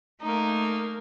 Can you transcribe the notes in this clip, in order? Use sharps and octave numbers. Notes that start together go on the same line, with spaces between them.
A3 A#3 D#4